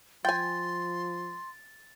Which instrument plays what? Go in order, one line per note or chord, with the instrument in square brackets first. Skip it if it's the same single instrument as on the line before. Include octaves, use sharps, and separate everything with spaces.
[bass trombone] F3 [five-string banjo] G5 G#5 [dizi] C6 [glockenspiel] A6